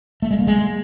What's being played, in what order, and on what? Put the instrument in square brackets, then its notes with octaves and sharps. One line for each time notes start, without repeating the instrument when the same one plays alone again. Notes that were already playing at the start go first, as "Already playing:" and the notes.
[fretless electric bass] A3
G#3
A#3
G#3